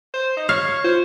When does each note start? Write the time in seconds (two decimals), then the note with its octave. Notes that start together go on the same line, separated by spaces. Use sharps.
0.14 C5
0.37 D#4
0.49 C#5 F5
0.84 F4 C5